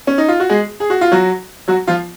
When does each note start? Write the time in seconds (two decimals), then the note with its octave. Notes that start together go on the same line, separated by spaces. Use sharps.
0.07 C#4
0.18 D#4
0.28 F4
0.40 F#4
0.49 G#3 G#4
0.80 G#4
0.90 F#4
1.01 F4
1.12 F#3 F#4
1.68 F#3 F#4
1.87 F3 F4